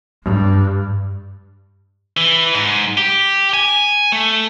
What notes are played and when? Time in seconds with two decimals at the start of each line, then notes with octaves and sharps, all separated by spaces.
0.23 G2
2.17 E3
2.55 G#2
2.98 G4
3.54 G#5
4.12 A3